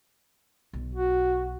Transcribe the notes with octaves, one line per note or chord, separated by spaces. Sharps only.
B1
F#4